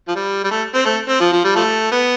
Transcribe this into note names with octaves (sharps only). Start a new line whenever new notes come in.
F3
G3
G3
A3
C4
A3
C4
F3
F3
G3
F3 A3
B3